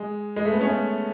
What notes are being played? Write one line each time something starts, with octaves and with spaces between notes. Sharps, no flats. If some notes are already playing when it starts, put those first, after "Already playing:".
Already playing: G#3
G#3
A3
B3
C#4
A3